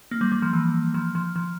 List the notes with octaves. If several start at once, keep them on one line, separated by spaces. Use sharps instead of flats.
A#3
G3
G3
F3
E3
F3
F3
F3